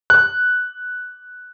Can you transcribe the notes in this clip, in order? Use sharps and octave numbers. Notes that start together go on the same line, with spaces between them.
F#6